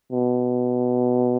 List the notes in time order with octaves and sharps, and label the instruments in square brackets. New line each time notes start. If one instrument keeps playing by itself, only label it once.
[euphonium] B2